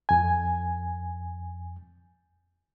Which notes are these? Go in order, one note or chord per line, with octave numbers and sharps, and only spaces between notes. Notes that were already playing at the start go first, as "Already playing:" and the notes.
F2 G#5